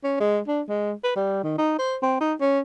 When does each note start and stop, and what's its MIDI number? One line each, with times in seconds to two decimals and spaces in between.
0.04 0.20 61
0.20 0.39 56
0.47 0.62 62
0.69 0.92 56
1.04 1.14 71
1.16 1.42 55
1.44 1.57 51
1.58 1.75 63
1.79 1.97 72
2.03 2.18 60
2.21 2.34 63
2.41 2.60 61